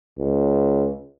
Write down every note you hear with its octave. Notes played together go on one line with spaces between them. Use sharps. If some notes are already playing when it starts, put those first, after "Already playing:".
C#2